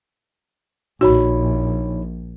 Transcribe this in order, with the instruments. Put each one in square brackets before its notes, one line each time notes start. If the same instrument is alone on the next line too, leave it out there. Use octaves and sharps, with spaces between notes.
[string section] A#1 [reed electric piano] D#4 C#5 B5 [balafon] F#4